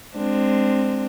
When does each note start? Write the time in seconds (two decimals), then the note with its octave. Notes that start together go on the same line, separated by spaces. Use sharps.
0.16 G#3 C4 D4